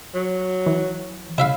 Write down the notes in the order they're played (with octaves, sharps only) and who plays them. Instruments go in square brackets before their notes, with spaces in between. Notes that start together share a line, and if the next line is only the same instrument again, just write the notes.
[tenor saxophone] F#3
[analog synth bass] E3
[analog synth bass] C#3 [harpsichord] E4 E5 F5